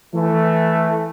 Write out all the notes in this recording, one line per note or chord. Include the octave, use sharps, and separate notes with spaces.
E3 A3